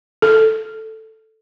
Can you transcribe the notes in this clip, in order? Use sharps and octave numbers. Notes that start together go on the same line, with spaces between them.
A4